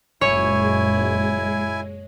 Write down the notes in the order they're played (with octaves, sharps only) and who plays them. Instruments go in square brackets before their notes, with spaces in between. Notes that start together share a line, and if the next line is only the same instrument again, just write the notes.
[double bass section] F#1 F#2 A#2 [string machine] G#3 [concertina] E4 G#5 [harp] C#5